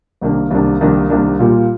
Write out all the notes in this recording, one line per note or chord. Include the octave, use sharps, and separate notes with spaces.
C2 C3 D#3 A#3 D4
C2 C3 D#3 A#3 D4
C2 C3 D#3 A#3 D4
C2 C3 D#3 A#3 D4
A#2 G3 A#3 F4